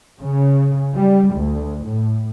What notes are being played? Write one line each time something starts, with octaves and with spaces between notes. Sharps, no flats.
C#3
G3
D2
A2